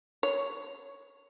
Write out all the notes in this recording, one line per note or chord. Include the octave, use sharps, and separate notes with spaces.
C#5